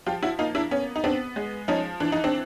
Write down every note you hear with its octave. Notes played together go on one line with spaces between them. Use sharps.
F3 F4 G4
E4 F#4
A#3 D#4 F4
D4 E4
B3 C#4
D#4
B3 C4 D4
G#3
F3 C#4 D#4
E3 D4
D#4
C4 D4